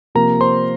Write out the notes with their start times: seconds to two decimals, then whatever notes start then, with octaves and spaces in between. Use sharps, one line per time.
0.15 C3 F3 A#3 A#4 A#5
0.41 C5 C6